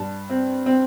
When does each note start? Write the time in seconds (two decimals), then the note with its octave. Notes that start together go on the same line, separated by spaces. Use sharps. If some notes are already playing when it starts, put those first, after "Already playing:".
Already playing: G2 A5
0.30 C4
0.66 C4